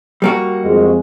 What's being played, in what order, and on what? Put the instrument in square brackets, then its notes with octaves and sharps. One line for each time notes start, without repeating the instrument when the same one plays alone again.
[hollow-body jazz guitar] G3 A#3 F#4
[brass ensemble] F2 G#3